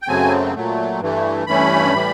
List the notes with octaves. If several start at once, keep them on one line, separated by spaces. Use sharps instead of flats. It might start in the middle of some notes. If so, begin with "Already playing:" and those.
G5
F#2 C#3 F#3 A3 C4 G#5
A#2 F#3 A3
G2 E3 A3
G2 E3 A3 C#4 B5
A2 E3 G3